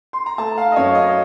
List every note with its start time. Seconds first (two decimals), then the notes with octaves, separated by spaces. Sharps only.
0.13 C6
0.26 A#5
0.38 A3 A5
0.58 F5
0.72 D#5
0.76 F#2 C#5
0.88 F5
0.95 D#5